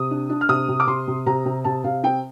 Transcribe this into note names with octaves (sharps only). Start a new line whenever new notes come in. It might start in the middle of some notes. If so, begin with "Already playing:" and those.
Already playing: C3 D#6
D4
D4
F6
C3 D#6
C3
D6
C3 C6
C3
C3 A#5
C3
C3 A5
C3 F5
C4 G5